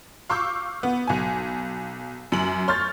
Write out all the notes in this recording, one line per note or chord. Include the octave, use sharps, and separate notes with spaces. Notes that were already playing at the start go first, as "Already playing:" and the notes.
F5 C#6 D6 E6 G6
B3
B1 G#5
F#2 F#7
C#5 C6 F6 G6 A6